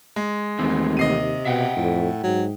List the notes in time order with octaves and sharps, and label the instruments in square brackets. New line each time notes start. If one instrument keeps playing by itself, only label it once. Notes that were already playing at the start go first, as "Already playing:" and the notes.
[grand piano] G#3
[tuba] D#2 [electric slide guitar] E3 A3 C4
[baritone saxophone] C3 [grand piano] D#5 C7 D#7
[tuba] B2 [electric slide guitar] E5 F#5 G5
[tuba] F2 [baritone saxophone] A2
[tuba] G#2 [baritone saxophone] F#3